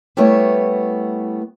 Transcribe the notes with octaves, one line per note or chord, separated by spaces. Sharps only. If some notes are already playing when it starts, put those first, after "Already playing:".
G3 A3 B3 E4 C#5